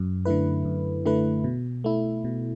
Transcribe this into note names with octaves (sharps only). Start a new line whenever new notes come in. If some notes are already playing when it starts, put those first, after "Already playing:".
Already playing: F#2
D3 A3 E4 B4
F#2
D3 A3 E4 B4
B2
A3 E4
B2